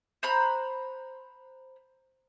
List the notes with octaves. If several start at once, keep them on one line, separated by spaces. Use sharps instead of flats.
C5 A#5 B5 F#6